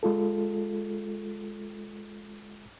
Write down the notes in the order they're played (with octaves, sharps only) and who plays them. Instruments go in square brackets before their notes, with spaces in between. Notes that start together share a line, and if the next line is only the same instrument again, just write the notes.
[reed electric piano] G#3 F4 A4